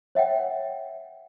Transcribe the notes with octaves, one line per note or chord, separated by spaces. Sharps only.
C#5 E5 F#5 G5